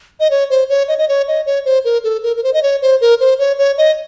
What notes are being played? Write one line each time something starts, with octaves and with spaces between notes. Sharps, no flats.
D#5
C#5
C5
C#5
D#5
D#5
C#5
D#5
C#5
C5
A#4
A4
A#4
A#4
C5
D#5
C#5
C5
A#4
C5
C#5
C#5
D#5